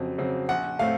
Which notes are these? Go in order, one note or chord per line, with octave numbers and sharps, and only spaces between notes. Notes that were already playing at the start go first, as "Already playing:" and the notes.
Already playing: F2 C#3 F#3 C4
C#3 F#3 C4
A#1 F#5
A2 A3 C4 F5